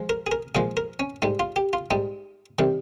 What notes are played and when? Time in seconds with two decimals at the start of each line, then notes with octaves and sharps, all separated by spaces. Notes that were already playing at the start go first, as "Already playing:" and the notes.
Already playing: F3 G#3
0.09 A#4
0.27 G#4
0.32 A#4
0.55 A#2 F3 G#3 G#4
0.77 A#4
1.00 C#4
1.22 G#2 G3 D#4
1.39 F4
1.56 G4
1.73 F4
1.91 G#2 G3 D#4
2.59 C3 D#3 G3